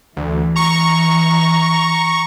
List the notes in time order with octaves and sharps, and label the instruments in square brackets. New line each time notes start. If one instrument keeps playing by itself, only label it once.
[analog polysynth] D2 [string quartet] E3
[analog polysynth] A#5 C#6